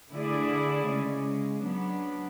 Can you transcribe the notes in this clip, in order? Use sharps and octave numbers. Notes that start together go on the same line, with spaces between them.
D3 A3 E4 G#4 D5
C#3 G#3 C#4
F#3 B3 D4